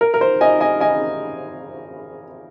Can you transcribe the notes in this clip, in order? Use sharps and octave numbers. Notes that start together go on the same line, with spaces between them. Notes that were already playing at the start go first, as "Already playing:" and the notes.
A#4
A#4
C5
D#5 G#5
D#5 G#5
D#5 G#5